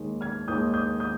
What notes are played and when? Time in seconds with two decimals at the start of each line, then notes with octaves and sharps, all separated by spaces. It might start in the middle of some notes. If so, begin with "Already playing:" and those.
Already playing: D#2 D#3 G#3
0.21 F6 G#6
0.48 D#2 D#3 G#3 D#6 G6
0.74 D#6 G6
1.00 D#6 G6